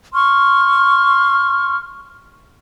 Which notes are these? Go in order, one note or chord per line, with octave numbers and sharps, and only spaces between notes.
C6 C#6 F6